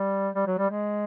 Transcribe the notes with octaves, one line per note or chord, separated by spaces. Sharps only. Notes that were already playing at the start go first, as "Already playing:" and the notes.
Already playing: G3
G3
F#3
G3
G#3